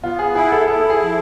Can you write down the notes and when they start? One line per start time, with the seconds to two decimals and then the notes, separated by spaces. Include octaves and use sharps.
0.03 B3 F4
0.19 G#4
0.35 E4 G#4
0.52 A4
0.68 E4 A4
0.90 G#4
1.01 F3